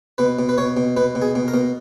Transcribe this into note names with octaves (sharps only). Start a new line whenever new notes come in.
B2 B4
B2
B4
B2 C#5
B2
B2 B4
B2
G#4
B2
A#4
B2